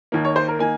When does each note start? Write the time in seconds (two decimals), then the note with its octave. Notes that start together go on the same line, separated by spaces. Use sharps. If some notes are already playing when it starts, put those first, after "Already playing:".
0.12 D#2 D#3 A#3
0.25 C#5
0.36 C5
0.48 A#4
0.59 D#3 A#3 G#5